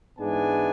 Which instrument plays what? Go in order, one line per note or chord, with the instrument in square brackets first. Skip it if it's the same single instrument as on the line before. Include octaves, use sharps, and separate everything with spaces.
[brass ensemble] G#2 E3 G#3 B3 D4 G#5